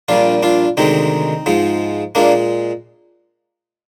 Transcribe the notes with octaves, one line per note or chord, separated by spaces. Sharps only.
A#1 A#2 G3 D4 F4
D4 F4
D2 C3 D#3 G#3 C4 D#4
G#2 F3 G#3
A#2 G#3 A#3 D4